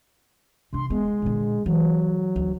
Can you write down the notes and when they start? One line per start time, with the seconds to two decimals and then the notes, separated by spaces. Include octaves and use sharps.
0.73 C3 D4 C6
0.90 G#3 B3
1.22 A#2 D3
1.66 E3 F#3
2.36 D2